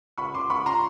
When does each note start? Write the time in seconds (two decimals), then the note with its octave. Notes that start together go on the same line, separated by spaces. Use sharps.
0.18 C#2 B5 C#6
0.34 C#2 C6 D6
0.50 C#2 B5 C#6
0.66 A#5 C6